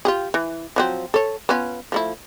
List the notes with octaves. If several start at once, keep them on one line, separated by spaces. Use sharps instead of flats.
F4 G4 G#4
E3
F3 F#3 C4
A4 C#5
B3 C#4 F4
F3 A3 E4